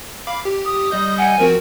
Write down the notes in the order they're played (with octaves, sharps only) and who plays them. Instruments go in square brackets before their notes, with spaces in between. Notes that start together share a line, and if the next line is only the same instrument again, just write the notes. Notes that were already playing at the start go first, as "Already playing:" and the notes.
[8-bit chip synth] F5 B5 D6
G4
[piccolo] D#6
[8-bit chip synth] G3 D#5 G6
[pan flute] F#5 [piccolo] G#5
[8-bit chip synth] F3 C4 F#4 [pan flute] A#4